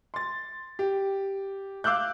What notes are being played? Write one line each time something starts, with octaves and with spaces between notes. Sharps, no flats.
C6 A6
G4
F5 D6 E6 F#6 G6